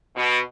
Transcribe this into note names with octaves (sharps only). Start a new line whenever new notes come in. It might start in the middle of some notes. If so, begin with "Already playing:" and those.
B2